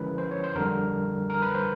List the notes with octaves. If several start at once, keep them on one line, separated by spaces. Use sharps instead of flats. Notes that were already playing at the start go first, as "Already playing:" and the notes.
Already playing: D3 F3 G#3 C#4 E4 A#4 B4
C5
C#5
C5
F2 D3 G3 A#4
A#4
B4
C5